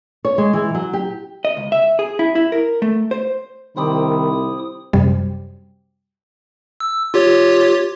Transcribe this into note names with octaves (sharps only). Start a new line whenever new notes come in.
C#5
G#3
E3
F#3
G4
D#5
C#2
E5
G#4
E4
E4
A#4
A3
C5
C2 D#3 C4 E4 B5 D6 D#6
F#2 C3 G3
E6
F4 G4 C#5